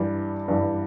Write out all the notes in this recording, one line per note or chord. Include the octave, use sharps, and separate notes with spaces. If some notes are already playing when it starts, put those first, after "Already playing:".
Already playing: G2 E3 G3
G2 E3 G3